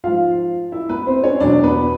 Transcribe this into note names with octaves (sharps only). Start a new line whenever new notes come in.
G#2 F3 F4 F5
E4 E5
B3 B4
C4 C5
C#4 C#5
E2 B2 F#3 D4 D5
B3 B4